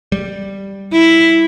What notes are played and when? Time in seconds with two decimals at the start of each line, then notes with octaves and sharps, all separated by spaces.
0.12 G3
0.93 E4